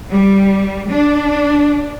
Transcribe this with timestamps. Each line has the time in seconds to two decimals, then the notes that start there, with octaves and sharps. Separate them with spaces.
0.11 G3
0.90 D4